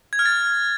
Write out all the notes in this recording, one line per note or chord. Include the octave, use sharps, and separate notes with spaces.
G#6
F6
A6